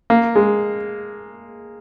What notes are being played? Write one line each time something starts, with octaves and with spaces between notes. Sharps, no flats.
A#3
G#3